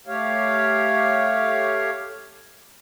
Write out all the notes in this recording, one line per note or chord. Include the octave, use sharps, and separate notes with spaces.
A3 G4 C#5 F5